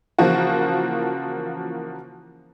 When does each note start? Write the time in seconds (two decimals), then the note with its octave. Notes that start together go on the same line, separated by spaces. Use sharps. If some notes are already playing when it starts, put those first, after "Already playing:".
0.19 C#3 E3 F3 A#3 F4 F#4